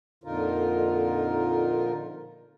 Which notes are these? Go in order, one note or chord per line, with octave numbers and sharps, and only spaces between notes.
F2 A#2 D3 D#4 F4 A#4